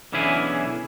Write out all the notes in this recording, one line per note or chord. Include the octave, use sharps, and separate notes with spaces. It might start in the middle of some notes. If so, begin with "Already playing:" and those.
B1 D3 E3 C#4 E4 G#4